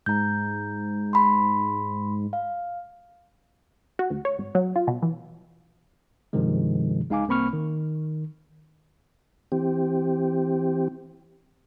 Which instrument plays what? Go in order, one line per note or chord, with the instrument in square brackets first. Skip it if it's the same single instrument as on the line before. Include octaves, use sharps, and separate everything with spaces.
[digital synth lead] G#2 [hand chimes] A#5 G6
[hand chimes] B5 C6
F5
[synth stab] F#4
D2
C#5
G#1
F#3
F4
B2
E3
[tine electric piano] G2 C3 D#3 F3 G#3
C#2 G#3 D#4 F5 G#5 D6
C2 A#3 C4 B5 C#6 F6
D#3
[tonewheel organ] E3 C4 G4